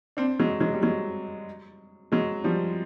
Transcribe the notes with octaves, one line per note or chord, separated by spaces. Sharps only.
C4 D4
F#3 G#3
F#3 G#3
G3
F#3 G#3
F#3 G#3
F3 G3